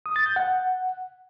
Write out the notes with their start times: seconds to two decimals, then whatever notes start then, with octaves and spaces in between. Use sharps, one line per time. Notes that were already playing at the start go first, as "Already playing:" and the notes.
0.06 D#6
0.16 A6
0.26 G6
0.36 F#5